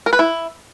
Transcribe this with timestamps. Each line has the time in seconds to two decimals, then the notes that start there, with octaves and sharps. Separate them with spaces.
0.06 A#4
0.13 B4
0.19 E4